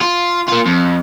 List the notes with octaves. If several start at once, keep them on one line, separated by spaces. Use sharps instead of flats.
F4
A#3 F4
F2